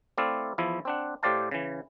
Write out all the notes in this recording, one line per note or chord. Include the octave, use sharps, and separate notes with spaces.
A3 C4 E4 D5 F5
E2 F3 E4
C4 D4 F#5
A2 G4 C5 D5 F5 A5
C#3 E3